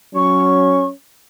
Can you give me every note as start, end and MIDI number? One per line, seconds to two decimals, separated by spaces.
0.15 0.90 54
0.15 0.90 61
0.15 0.85 85